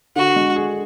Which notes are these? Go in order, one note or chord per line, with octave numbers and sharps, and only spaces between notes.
D3 F#4
G#3
G#4